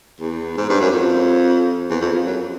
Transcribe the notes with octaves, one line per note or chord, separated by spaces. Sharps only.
E2
G#2
G2
F#2
F2
E2
F2
F2
F#2